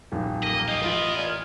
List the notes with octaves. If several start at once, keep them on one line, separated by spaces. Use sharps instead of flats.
D#1 B1 F2
A#3 D#5
F4 C5 D#5
A1 E2 B3 F4 D7
A#2 G#5 F6